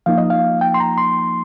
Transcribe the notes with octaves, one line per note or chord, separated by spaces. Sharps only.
F3 A#3 D#4 F5
D#5
F5
G5
C6
A#5
C6